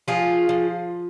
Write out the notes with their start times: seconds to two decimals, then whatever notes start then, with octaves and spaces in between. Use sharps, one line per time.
0.08 F3 F4 G#4
0.49 F3